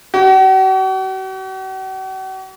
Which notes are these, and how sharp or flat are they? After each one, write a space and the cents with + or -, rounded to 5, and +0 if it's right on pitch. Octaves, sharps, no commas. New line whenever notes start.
F#4 +45